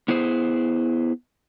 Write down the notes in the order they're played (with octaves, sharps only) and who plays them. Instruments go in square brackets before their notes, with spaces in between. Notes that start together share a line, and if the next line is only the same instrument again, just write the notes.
[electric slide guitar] B3 E4 G#4 C5